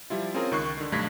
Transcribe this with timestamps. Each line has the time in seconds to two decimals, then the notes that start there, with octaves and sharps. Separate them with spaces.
0.10 F3 G3 E4 F4
0.34 C4 C#4 F4 G#4 A#4
0.51 C#2 D#3 C#6 F#6 C7
0.77 D3 D#3
0.92 B1 G2 A3 G#6 A#6 B6